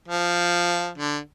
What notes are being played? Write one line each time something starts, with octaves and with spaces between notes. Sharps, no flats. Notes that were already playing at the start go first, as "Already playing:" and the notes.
F3
D3